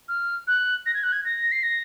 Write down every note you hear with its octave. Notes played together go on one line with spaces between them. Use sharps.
F6
F#6
A#6
G#6
F#6
G#6
A#6
C7
A#6